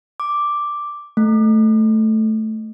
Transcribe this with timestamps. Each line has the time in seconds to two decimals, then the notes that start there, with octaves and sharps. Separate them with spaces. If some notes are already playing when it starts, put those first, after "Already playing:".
0.20 D6
1.17 A3